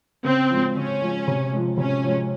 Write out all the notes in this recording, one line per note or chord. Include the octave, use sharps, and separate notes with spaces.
C#3 C4
F3 G#3
C#3 C#4
F3 G#3
C3
F3 G#3
C3 C#4
F3 G#3